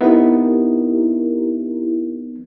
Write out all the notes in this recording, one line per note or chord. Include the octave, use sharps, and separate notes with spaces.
B3 C4 D#4 E4 G4 A#4